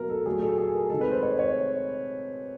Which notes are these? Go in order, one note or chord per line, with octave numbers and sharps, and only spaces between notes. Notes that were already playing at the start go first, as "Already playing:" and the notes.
Already playing: B2 F#3 A#3 A#4
A4
A#2 F#3 A3 G#4
A4
G#4
A#4
C3 D#3 G#3 A4
B4
C5
C#5
C#5